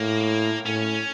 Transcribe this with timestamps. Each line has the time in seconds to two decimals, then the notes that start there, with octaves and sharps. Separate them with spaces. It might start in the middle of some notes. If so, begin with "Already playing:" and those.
Already playing: A2 A#3
0.65 A2 C#4